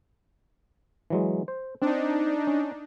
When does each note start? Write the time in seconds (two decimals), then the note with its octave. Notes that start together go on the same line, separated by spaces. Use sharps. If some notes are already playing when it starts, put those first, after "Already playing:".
1.10 E3 F#3 G#3
1.48 C5
1.82 C4 D4 D#4
2.47 C#4